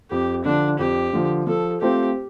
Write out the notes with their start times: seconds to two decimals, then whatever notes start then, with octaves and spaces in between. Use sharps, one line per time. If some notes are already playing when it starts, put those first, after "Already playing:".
0.11 F2 G4
0.45 D3 F3 D4
0.79 F2 G4
1.13 D3 F3
1.47 F3 A4
1.81 A3 C4 F4 G4 C5